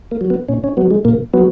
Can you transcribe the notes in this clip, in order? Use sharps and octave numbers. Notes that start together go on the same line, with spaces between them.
A#3
F#3
B3
A#2 C#4
C#4
F#3 B3
G#3
A#2 A#3
F#3 B3